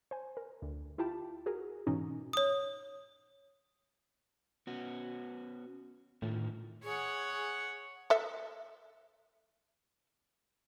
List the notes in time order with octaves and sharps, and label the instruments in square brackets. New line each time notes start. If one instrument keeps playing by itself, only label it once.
[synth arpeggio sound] C5 G#5
A#4
D2
E4 F4 G4 A5 B5
F#4 G#4 A#4
G#2 B2 E3 C#4 D#4 F#4
[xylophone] C#5 D#6
[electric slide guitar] B3 C#4 F#4
[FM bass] A2 [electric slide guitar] D3 D#3 F4
[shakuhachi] G#4 [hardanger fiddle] C#5 F#5
[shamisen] A4 E5